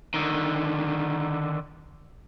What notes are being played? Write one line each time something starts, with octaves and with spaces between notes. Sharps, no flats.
D3 D#3